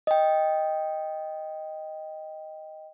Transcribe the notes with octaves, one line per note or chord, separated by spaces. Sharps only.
D#5 G5